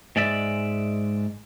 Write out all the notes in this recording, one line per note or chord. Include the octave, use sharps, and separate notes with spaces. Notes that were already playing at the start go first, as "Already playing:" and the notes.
G#2 G#3 D5 E5